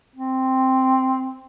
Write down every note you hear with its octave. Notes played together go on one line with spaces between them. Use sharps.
C4